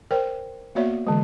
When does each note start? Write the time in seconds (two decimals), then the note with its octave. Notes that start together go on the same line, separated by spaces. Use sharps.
0.11 A#4 C5 D5 G5
0.75 A#3 B3 F#4 C#5 D5 E5
1.07 D3 E3 G#3